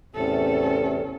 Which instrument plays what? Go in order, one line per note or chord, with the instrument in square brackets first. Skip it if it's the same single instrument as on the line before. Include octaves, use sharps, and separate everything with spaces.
[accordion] E2 A2 C3 [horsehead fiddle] C#4 A4